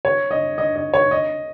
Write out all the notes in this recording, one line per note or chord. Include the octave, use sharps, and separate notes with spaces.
C#5
D#5
D#5
D#5
C#5
D#5